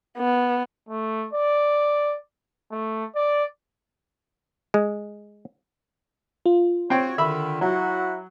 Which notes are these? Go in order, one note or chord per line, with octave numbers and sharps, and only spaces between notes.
B3
A3
D5
A3
D5
G#3
F4
C4 F#4 C#5 G5
D3 D#3 E5 B5
F#3 E4 F#4 F#5